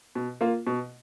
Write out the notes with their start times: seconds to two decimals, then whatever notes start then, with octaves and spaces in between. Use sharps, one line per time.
0.15 B2
0.41 A#3 F4
0.67 B2